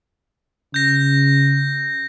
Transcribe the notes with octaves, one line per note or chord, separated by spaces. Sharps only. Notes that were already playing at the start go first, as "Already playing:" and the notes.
C#3 G6 A#6